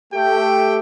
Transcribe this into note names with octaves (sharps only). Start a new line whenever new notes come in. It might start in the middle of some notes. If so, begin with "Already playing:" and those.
A3 G4 G5